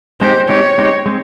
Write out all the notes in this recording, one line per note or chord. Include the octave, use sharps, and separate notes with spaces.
G#3 C4 D#4 G4 C5
G#3 C4 D#4 G4 C#5
G#3 C4 D#4 G4
G#3 C4